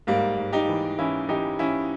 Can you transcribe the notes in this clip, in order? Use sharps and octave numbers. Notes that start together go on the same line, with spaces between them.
G#2 G3 A#3
G#2
D#4 G4
E3
E3 C#4 E4
E3 D#4 G4
E3 C#4 E4